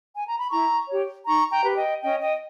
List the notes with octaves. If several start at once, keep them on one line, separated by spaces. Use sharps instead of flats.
G#5
A#5
B5
E4 A#5 C#6
G4 C#5
D#4 A#5 C#6
G5 A#5
G4 B4
D#5 G5
C#4 D#5 G5
D#5 G5